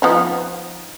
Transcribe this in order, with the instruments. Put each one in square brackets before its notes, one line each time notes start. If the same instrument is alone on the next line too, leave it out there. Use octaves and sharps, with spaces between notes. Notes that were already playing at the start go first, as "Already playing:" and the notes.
[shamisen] F3 B3 D#4